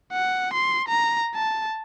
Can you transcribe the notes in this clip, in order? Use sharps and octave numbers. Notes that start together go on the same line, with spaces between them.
F#5
C6
A#5
A5